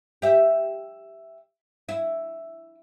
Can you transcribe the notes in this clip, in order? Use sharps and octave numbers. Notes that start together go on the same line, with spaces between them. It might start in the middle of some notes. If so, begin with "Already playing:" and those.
G4 E5
E4